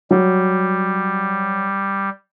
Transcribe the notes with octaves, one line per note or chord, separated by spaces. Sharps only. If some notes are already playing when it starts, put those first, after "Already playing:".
F#3 G3